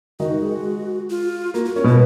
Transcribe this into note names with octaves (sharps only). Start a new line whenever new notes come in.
D#3 D#4 F#4
G#3
F4
A#3 F#4
F#4
C#4 A#4
B2 B3 B4